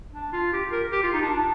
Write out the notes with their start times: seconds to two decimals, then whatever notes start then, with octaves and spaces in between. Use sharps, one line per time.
0.12 D4
0.33 F4
0.53 G4
0.72 A#4
0.92 G4
1.03 F4
1.13 D#4
1.22 D4
1.32 D4